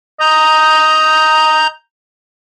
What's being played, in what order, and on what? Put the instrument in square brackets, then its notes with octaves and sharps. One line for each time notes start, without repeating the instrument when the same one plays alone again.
[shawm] D#5 [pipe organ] A#5 G6